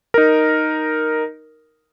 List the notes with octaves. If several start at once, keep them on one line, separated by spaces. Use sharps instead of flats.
D#4 A#4